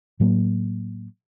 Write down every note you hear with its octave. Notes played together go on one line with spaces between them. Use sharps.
A2 F#3 A#3